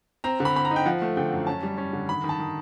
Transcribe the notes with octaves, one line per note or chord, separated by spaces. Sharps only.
C4 A#5
D3
B5
C4 B5
A#5
D#4
G5
F3 F#5
A3
D3 G5
F#2
C#4 A5
G3
C#4
D3
D#3 B5
D#3
A5
D#3